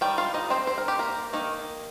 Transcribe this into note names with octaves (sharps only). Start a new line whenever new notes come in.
D#3 G3 G5
F4 F5
D#4 D#5
C4 C5
C5
A#4
G4
A#3 A#4
D#3 A#3 D#4